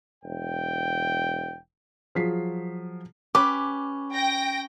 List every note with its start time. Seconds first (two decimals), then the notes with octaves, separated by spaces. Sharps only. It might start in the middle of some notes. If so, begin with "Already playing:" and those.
0.24 E1 G5
2.15 F3 F#3 G#4 B6 C7
3.35 C#4 G4 B4 D6
4.14 G5 A#6